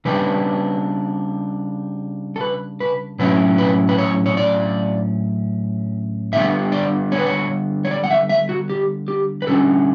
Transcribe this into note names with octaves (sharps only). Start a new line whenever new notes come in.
C#3 G3 D4 B4
A4
B4
B4
A2 F#3 C#4 E4 B4
B4
B4
C#5
C#5
D5
D3 G3 B3 E5
D5
C#5
B4
C#5
C#5
D5
F#5
E5
E5
F#4
G4
G4
B4
D3 G3 C#4 A4